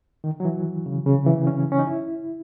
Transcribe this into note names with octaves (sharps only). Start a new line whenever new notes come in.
D#3
F#3
E3
C#3
C#3
E3
C#4
C#4
D#4
E4